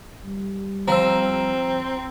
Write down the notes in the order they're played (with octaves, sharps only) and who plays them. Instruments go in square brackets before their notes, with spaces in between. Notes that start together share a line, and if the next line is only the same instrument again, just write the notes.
[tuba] G3
[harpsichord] F3 [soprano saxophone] C4 [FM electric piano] A#5 E6